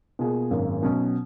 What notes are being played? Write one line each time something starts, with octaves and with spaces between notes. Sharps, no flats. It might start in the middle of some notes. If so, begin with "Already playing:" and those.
B2 A#3 F4 G#4
G#1 F#2 D#3 A#3
B2 F#3 C#4